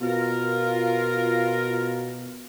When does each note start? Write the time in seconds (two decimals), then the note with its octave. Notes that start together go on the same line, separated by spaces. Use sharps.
0.01 B2 F4 A#4